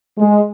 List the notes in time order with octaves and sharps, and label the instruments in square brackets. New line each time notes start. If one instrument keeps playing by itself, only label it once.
[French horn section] G#3